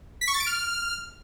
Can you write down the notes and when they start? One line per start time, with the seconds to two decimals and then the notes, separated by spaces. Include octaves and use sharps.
0.21 B6
0.28 C#6
0.34 A6
0.40 D7
0.46 F6